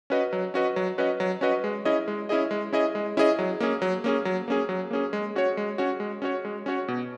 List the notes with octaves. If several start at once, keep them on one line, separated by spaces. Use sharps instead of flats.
C#4 F#4 B4 D#5
F#3
C#4 F#4 B4 D#5
F#3
C#4 F#4 B4 D#5
F#3
C#4 F#4 B4 D#5
G#3
C#4 E4 G#4 D#5
G#3
C#4 E4 G#4 D#5
G#3
C#4 E4 G#4 D#5
G#3
C#4 E4 G#4 D#5
F#3
A#3 C#4 G#4
F#3
A#3 C#4 G#4
F#3
A#3 C#4 G#4
F#3
A#3 C#4 G#4
G#3
C#4 F#4 C#5
G#3
C#4 F#4 C#5
G#3
C#4 F#4 C#5
G#3
C#4 F#4 C#5
B2